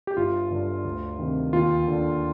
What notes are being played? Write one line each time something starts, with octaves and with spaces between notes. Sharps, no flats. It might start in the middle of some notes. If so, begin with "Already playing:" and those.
G4
G1 F4
G2 D3
D2
C3 D#3
D#2 F4
D3